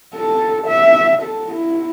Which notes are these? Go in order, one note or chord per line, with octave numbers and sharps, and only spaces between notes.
A4
E5
A4
E4